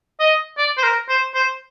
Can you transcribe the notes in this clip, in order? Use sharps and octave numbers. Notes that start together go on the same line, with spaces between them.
D#5
D5
C5
A#4
C5
C5